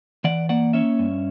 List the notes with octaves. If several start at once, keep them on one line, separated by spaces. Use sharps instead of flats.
E3 D5 F#5
A#3 D5 F#5
C#4 C#5 E5
G2